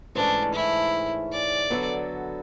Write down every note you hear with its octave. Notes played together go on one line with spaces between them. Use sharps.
G#2 E3 A3 C#4 D4
E4
D5
D3 F#3 B3 F#4 A4